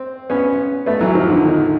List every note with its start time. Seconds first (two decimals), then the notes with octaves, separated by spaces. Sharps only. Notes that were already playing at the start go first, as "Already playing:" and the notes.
Already playing: C4
0.30 B3 C#4
0.86 A3 B3
1.01 E3 F#3
1.15 D#3 F3
1.30 D3
1.44 D#3